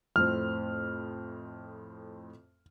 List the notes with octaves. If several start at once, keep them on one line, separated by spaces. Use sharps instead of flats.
F2 A2 C4 F6